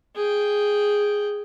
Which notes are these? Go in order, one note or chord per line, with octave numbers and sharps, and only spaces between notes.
G#4 G5